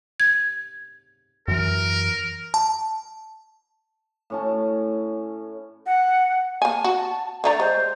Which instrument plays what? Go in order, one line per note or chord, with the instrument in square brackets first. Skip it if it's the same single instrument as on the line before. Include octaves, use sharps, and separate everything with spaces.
[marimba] G#6
[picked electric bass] F#2 E3 [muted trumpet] A#4
[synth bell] A5
[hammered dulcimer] A2 C#4 A5
[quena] F#5
[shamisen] A#3 G#5 [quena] A5
[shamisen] F#4
[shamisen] D3 A3 A#5 [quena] D5
[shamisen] G#3 [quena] C5